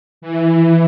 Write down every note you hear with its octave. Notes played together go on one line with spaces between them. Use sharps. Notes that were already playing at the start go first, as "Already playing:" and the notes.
E3